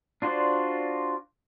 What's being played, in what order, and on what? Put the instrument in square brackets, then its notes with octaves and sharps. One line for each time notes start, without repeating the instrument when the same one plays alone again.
[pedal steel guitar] D4 F4 F#4 C5 D5